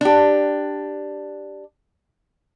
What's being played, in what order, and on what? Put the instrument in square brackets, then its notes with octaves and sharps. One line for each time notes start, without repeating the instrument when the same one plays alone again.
[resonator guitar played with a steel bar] D4 G4